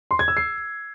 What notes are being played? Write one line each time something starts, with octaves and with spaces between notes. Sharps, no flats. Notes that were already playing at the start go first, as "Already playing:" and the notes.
C6
G#6
E6
C7